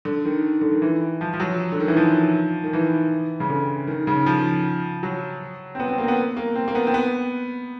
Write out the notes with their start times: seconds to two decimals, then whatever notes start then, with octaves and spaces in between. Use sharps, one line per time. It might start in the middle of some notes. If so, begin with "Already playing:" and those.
0.05 D3
0.25 D#3
0.61 D3
0.72 D#3
0.82 E3
1.21 F3
1.34 F3
1.40 F#3
1.72 D3
1.80 D#3
1.88 E3
1.97 F3
2.64 D#3
2.73 E3
3.40 C#3
3.50 D3
3.87 D#3
4.07 C#3
4.26 F3
5.03 F#3
5.75 C4
5.79 B3
5.89 C4
5.98 A#3
6.03 C4
6.08 B3
6.37 A#3
6.55 C4
6.68 A#3
6.75 B3
6.87 C4
6.94 B3